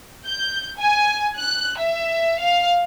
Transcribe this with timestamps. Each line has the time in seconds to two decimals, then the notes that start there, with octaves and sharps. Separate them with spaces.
0.27 G6
0.79 G#5
1.38 F#6
1.79 E5
2.39 F5